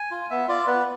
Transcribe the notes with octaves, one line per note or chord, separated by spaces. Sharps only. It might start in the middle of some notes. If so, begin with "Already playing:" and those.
Already playing: G#5
F4
B3 E5
F4 D5
B3 B4